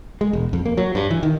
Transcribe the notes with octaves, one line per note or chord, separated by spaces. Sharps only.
G#3
E1
F2
A#3
F#3
G2
E3
D#3